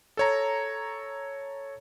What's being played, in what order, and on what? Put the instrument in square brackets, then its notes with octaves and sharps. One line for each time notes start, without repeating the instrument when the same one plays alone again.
[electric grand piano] A4 C#5 A#5